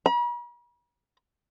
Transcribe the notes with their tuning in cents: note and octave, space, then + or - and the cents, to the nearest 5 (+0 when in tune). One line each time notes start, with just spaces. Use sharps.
B5 -45